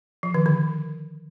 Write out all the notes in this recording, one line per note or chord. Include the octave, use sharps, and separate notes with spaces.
F3
D#3
D3